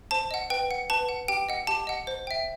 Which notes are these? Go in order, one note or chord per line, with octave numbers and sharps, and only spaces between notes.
C5 A5
D#5 F#5
B4 G5
F#5
B4 A5
F#5
G4 G5
D#5 F#5
G4 A5
D#5 F#5
C5
E5 G5